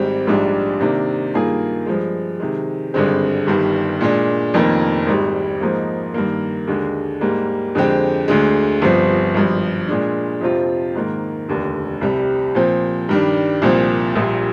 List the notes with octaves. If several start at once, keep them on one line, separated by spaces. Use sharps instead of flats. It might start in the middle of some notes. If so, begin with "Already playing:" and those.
Already playing: G#1 G#2 G3 C4
A#1 G#2 G3 D4
C3 D#3 A#3 D4
G2 D#3 A#3 F4 G#4
G2 F3 G#3
C3 D#3 G#3
G#1 G2 D3 G#3 C4
G1 G2 D#3 G3
A#2 G#3 D4
F1 F2 D#3 A#3
G#1 G#2 G3
G#2 F3 A#3 D#4
G2 D#3 A#3
D#2 D3 G#3
G#2 G3 A#3
F2 D3 G#3 C4 G4
D2 D3 G#3
G1 G2 F3 C4
G#1 G2 F3
A#2 G#3 D4
F2 C3 F3 C4 F4
G#2 D#3 A#3
F1 D#2 D3
C2 C3 G3
A#2 F3 C4
G2 D#3 G3 D4
C2 A#2 F3 C4
A#1 A#2 G3